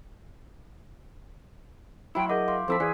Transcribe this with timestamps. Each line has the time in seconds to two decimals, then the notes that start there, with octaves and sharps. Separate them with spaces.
2.15 F#3 E4 G5 B5 C6
2.30 G#4 A#4 D#5 F#5 D6 G6
2.48 F5 C6 D6
2.68 F2 C4 E4 A4 C5 C6 E6 B6
2.80 E3 G#4 B4 D5 G#5